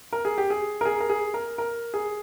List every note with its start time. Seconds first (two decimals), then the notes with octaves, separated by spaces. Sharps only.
0.13 A#4
0.25 G#4
0.38 G4
0.50 G#4
0.81 A#4
0.85 G#4
1.00 A#4
1.10 G#4
1.34 A#4
1.58 A#4
1.94 G#4